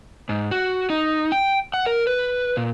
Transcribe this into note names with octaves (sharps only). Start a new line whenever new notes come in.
G#2
F#4
D#4
G5
F#5
A#4
B4
A#2